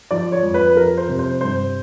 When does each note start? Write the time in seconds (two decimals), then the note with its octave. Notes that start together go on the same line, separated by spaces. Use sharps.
0.11 F3 D5
0.32 C#5
0.43 F2
0.54 B4
0.75 F3 A#4
0.97 C5
1.09 C3
1.19 C5
1.41 G2 C5